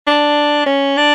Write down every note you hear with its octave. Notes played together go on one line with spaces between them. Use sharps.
D4
C#4
D4